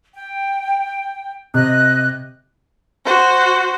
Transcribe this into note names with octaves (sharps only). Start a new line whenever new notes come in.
G5
C3 D#5 F#6
F#4 C5